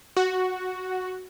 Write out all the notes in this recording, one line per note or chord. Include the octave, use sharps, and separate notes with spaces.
F#4